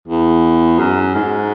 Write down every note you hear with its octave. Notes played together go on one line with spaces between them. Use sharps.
E2
F#2
G#2